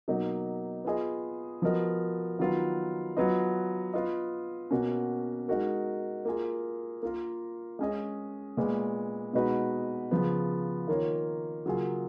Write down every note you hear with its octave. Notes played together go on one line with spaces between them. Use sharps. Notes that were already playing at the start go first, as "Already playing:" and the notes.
B2 F#3 A#3 D#4
B3 F4 G#4 D#5
F3 B3 F#4 A#4 D#5
D#3 F#3 B3 F4
F#3 B3 F4 B4 D#5
B3 F4 B4 D#5
B2 A#3 C#4 F#4
G#3 D#4 F#4 A#4
A#3 F4 G#4
A#3 F4 A#4
G#3 C#4 G#4 D#5
A#2 G#3 B3
B2 G#3 D#4 F#4 B4
C#3 F3 B3
D#3 A#3 F4 A#4 C#5
C#3 F#3 A#3 F4 G#4